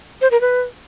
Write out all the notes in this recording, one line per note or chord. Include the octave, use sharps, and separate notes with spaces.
C5
A#4
B4